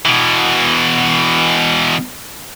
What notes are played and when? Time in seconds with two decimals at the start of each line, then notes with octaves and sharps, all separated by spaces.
0.05 B2 E3